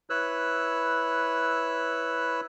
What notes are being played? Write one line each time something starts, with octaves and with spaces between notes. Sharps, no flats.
E4 B4 C#5 E6 F#6